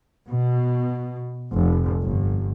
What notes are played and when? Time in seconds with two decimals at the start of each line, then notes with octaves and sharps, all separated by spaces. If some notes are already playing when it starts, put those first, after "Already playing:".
0.28 B2
1.52 F1
2.02 G1